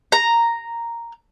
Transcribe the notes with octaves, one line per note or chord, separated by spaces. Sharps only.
A#5